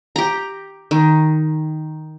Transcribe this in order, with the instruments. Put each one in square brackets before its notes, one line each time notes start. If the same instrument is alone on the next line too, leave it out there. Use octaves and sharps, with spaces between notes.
[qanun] G4 A#5
D#3